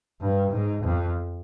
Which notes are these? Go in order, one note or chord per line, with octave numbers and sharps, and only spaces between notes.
G2
G#2
F2